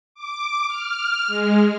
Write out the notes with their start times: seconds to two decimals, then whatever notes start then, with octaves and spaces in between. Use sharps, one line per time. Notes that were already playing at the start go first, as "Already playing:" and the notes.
0.15 D6
0.68 F6
1.27 G#3